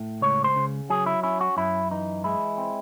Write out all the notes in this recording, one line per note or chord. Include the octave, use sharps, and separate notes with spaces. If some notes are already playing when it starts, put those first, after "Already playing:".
Already playing: A2
C#2 C#5
C5
C#3
F#3 G#4
E4
C#4 E4
F#4
F#2 E4
E3 D#4
G#3 E4
C4